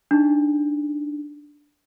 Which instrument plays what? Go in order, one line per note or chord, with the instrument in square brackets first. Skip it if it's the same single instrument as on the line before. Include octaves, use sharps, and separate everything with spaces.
[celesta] D4 D#4